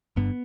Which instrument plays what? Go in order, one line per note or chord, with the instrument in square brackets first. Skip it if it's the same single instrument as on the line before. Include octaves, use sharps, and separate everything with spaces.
[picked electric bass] G1 G2 D3 B3